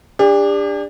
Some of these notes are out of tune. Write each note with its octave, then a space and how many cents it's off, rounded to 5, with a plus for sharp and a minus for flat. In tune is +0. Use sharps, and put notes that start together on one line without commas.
D4 +0 G4 +45